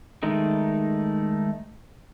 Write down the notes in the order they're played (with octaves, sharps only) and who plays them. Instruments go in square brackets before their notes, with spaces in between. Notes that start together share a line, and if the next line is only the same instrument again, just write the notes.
[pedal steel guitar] D#3 G#3 A3 D#4